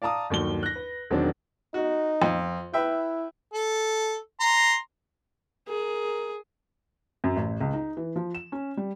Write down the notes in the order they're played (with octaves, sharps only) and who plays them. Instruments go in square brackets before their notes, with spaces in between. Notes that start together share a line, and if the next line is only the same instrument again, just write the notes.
[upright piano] D5 F5 A5 A#5 D#6
G1 D#2 F#3 G7
F#6 A#6
B4
E1 D#3 F#3 C4 D4
[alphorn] D#4 [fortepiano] F#4
[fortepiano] F2
[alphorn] E4 [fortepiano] B4 E5 G5
[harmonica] A4
A#5 C6
[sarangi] G#4 [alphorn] A#4
[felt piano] F#2
A1
C#2
D#4
E3
F3
E7
C#4
G3